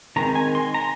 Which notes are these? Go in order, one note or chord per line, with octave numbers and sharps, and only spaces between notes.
D#3 G#3 C4 A#5
G#5
C6
A#5